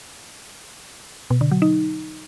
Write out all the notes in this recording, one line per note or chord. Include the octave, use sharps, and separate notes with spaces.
B2
D3
F#3
D#4